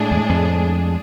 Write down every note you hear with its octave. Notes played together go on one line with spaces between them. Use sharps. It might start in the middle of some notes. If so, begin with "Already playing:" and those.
Already playing: A2 G#3 D4 G#4
E2
F2